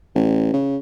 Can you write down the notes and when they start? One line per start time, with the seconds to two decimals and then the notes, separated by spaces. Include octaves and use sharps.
0.15 A1
0.53 C#3